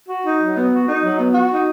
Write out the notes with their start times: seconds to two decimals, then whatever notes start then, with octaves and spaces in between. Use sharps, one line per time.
0.09 F#4
0.24 D#4
0.40 F#3
0.56 B3
0.71 F#4
0.87 D#4
1.03 F#3
1.18 B3
1.34 F#4
1.50 D#4